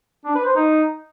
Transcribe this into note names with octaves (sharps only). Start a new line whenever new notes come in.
D4
B4
C5
D#4